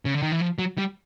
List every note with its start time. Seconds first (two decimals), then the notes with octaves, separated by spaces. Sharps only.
0.05 C#3
0.14 D3
0.22 D#3
0.32 E3
0.41 F3
0.59 F#3
0.78 G3